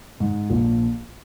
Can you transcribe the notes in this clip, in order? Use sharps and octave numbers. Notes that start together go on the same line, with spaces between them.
G#2
A#1